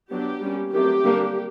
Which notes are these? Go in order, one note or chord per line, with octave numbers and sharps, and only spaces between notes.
F#3 B3 D4 G4
G3 A#3 C#4
D#3 F#3 A3 C4 G4
D3 G3 A#3 D4